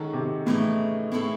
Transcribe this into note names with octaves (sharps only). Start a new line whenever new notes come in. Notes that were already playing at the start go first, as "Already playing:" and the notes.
Already playing: D#3 G#3 C#4 F#4 A4
C3
A2 C#3 E3 A3 D#4
A2 G#3 C4 E4 A4 C#5